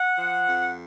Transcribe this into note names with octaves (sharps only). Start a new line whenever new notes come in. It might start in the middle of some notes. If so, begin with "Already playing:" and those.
Already playing: F#5
F3
F2